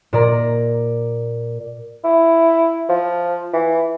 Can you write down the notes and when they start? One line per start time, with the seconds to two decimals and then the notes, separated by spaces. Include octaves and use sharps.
0.13 A#2 D5 A#5
2.04 E4
2.89 F3
3.53 E3